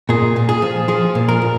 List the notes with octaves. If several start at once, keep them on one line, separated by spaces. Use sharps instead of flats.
A#2 G#4
A#2
G#4
F3
F3 G#4
A#2
A#4
A#2